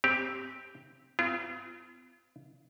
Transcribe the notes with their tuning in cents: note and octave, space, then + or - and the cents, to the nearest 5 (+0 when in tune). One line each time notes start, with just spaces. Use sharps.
C4 +0 G4 +0
C4 -45 F4 -40